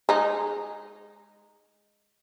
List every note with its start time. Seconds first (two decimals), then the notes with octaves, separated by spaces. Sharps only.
0.09 G#3 D#4